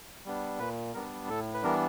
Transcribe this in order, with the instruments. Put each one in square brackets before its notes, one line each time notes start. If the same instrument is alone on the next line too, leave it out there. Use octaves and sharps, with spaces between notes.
[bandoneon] G3 B3 D4
A#2 B4
G3 B3 D4 A#4
A2 A4
B4
E3 G3 B3 D4 A#4